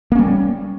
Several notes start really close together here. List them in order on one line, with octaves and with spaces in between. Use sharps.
A#3 C#4 G3